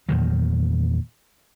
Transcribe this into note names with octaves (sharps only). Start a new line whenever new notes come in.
E2 A#2 D#3 F#3